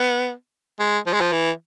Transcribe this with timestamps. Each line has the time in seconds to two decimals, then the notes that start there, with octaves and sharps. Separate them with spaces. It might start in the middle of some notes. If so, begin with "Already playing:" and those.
Already playing: B3
0.80 G#3
1.06 F3
1.13 G#3
1.21 F3
1.32 E3